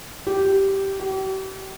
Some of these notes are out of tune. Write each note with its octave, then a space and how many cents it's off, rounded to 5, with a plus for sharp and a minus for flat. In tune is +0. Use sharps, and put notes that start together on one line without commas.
G4 -10
G4 -40